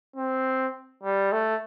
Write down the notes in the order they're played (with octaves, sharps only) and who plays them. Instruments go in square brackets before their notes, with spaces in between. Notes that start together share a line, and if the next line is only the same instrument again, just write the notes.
[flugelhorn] C4
G3
A3